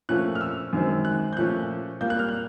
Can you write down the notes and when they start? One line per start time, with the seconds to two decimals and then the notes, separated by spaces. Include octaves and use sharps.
0.09 A#2 F3 A3 C#4 F#6
0.35 F6
0.41 E6
0.73 F#2 D#3 G#3 C4
1.05 F#6
1.33 G6
1.37 A#2 F3 A3 C#4 F#6
2.01 A#2 G3 A#3 G6
2.10 F#6
2.19 F6
2.29 F#6